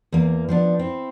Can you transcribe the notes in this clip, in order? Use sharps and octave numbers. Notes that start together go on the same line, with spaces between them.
E2 A#3
F3 B3 D4
C4 E4